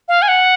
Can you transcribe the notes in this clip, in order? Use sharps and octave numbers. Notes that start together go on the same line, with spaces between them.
F5
G#5
F#5